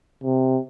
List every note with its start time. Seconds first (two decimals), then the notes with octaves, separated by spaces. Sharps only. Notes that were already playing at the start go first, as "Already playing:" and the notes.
0.24 C3